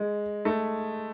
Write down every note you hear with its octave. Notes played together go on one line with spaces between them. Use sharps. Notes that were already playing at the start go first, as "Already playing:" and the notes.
Already playing: G#3
A3